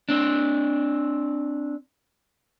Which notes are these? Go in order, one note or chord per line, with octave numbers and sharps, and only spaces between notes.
C4 D4